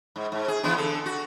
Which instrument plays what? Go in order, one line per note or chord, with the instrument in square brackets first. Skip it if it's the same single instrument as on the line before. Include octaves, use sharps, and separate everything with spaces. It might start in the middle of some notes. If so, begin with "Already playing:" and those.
[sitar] G#2
G#2
G#4
E3 B3 D4
D3 A4
F#4